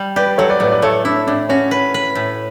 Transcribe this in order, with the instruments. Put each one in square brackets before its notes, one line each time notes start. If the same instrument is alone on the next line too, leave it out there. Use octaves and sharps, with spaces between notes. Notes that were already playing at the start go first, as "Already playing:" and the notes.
Already playing: [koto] G3
[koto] G4 [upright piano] B4 D5
[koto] F#3 [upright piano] A4 C#5
[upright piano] B4 D5
[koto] A2 [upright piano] B4 D5
[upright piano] B4 D5
[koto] A3 [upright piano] A4 C#5
[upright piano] D4 [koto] E4
[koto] A2 [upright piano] D4
[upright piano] C#4 [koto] F#4
[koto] B4
B4
A2